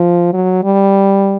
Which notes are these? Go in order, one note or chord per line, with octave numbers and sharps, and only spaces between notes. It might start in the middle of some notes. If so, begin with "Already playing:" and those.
Already playing: F3
F#3
G3